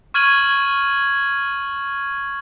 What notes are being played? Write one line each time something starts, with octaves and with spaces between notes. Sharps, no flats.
C#6 F6 G#6 D#7 F#7